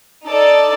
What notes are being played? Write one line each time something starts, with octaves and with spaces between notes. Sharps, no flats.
D#4 A4 D5 A5